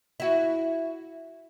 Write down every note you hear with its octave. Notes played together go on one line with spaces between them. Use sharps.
E4 F#4